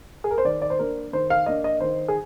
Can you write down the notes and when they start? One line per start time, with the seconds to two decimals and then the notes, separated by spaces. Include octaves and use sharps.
0.24 G#4
0.31 A#4
0.38 C5
0.45 D#3 D5
0.62 D5
0.70 C5
0.79 A#3 D4 A#4
1.13 D#3 C5
1.30 F5
1.46 A#3 D4 D#5
1.64 D#5
1.80 D#3 C5
2.08 G#4